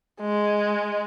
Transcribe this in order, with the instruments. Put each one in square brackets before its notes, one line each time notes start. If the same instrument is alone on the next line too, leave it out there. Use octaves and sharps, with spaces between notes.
[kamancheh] G#3